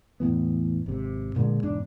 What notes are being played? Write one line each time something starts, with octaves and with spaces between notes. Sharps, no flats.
E2 A2 E3 B3
G#1 C3
A#2 D3 G#3
E1 G#2 D4